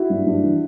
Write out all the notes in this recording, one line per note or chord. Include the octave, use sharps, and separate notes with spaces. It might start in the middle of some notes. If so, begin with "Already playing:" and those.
Already playing: E4 F#4
G2
G2
E3